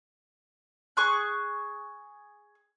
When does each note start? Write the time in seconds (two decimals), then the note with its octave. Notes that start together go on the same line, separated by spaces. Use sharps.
0.97 G#4 C#6 F#6